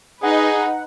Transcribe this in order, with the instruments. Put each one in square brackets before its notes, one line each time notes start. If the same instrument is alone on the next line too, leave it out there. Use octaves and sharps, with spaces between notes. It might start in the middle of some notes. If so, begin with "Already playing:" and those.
[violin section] D#4 B4 [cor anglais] G#4 [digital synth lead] F#5